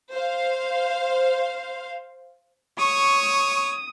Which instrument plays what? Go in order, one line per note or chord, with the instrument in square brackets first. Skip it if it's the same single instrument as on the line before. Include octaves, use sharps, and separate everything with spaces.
[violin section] C5 F5
[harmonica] C#5 [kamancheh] C#6 [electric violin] D#6